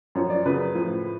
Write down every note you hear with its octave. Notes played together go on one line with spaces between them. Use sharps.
F#2 F3 C#5
D5
F#2 C#3 F3 B4
A2 F3